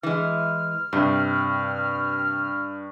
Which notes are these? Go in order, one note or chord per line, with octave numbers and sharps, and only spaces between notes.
E3 G#3 F6
G2 C3